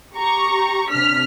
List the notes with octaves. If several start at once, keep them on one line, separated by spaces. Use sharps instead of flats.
G4 A#5 C#6
C3 D4 F6 B6